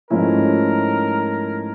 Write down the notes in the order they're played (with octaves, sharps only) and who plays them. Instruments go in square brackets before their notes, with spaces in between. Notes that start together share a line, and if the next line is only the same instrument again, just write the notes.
[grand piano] G#2 F3 A3 C#4 E4 [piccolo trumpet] A#4